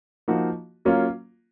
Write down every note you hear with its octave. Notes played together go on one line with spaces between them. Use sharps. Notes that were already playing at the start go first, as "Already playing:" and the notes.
F3 A#3 D#4 F#4
F#3 A#3 C#4 F4